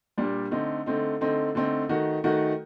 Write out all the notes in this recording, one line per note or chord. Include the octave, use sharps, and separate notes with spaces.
A#2 G3 D4
D3 A3 C4 D#4
D3 A3 C4 D#4
D3 A3 C4 D#4
D3 A3 C4 D#4
D#3 A3 D#4 F#4
D#3 A3 D#4 F#4